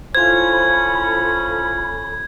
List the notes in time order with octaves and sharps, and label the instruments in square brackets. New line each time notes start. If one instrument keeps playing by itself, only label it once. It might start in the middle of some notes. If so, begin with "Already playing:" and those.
[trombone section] C#4 [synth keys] E4 F4 C5 [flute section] A4 B5 [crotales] G#6